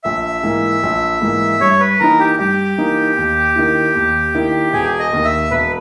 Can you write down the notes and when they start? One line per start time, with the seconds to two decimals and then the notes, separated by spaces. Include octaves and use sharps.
0.04 A#1 E5
0.43 G#2 E3 A#3
0.83 A#1
1.21 G#2 E3 A#3
1.60 G2 C#5
1.80 B4
2.00 E3 A#3 D#4 A#4
2.19 G4
2.39 G2 G4
2.78 E3 A#3 D#4
3.17 D#2
3.56 D#3 A#3 E4
3.95 D#2
4.35 D#3 A#3 E4
4.73 E1 G#4
4.99 D#5
5.13 D#2 D#3
5.25 E5
5.51 E1 B4